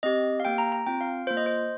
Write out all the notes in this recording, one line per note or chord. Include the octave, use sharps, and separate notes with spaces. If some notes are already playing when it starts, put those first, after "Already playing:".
C4 G4 D#5
F5
A#3 G4 G5
A#5
A#5
C4 F4 G5
F5
A#3 F4 C5
D#5
C5